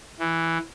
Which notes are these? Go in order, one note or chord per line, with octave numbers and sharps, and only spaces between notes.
E3